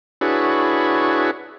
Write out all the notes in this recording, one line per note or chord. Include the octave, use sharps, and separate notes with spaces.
D4 E4 F#4 G#4 B4 C#5